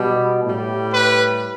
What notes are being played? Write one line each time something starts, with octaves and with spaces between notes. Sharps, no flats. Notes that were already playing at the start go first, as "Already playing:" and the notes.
Already playing: B2 G3
A2 G3
B4